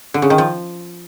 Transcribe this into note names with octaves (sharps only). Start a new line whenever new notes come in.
D3
C#3
D#3
F3